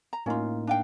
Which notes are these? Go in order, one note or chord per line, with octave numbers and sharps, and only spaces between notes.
A#5
A2 A#3 C#4 D#4 F4
D4 F5 G5